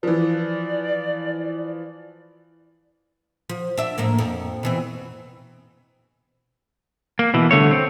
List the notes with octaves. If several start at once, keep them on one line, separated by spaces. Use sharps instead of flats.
E3 F3 D5
F3
D4 E5
A2 F3 A#3
F2
B2 E3 C4
A#3
B2 E3
C2 D3 A3 C#5
C4